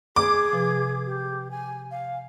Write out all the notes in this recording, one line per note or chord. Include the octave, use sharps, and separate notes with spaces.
G#4 D6
C3 F3 B4
G4
G#5
F5